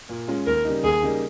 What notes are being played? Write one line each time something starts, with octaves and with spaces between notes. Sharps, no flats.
A#2
G#3 C#4 F4
D#2 A#4
C#3 G3 A#3 D#4
D#2 G#4
C#3 G3 A#3 D#4